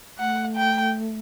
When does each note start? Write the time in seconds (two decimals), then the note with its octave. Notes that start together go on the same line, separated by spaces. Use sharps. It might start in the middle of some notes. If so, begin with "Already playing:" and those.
0.19 A3 F#5
0.56 G5